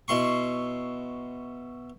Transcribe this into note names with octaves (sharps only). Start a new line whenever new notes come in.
B2 E4 C6 C#6